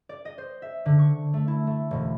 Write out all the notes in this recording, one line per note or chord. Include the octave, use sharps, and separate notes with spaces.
D5
D#5
C5
E5
D3
C#6
A3
E4
A3
E1